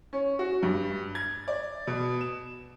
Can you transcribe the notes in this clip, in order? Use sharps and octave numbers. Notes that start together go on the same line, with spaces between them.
C#4
F#4
G2
G#6
D5
B2
E7